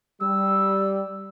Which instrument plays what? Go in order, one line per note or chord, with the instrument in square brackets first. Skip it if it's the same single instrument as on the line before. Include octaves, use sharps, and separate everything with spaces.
[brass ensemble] G3 [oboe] E6